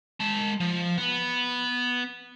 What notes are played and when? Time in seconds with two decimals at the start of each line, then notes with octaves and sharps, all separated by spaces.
0.20 G#3 A5
0.60 F3
0.97 B3